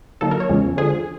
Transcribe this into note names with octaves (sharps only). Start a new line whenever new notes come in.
D3 F#3 A#3 D#4 A4
A#4
C#5
E2 C#3 F3 G#3 C#4
D3 F3 G#3 G#4